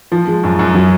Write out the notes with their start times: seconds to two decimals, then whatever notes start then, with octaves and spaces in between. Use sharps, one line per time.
0.12 F3
0.28 G#3
0.43 F#2
0.59 F#2
0.75 F#3